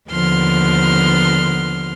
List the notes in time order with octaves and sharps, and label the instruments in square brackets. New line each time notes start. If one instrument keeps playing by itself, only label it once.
[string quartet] D#2 D3 F3 B3 C6 F6